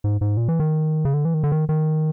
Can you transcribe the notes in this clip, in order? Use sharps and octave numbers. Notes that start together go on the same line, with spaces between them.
G#2
G#2
A#2
E3
D#3
C#3
D3
E3
D#3
D3
D#3
D#3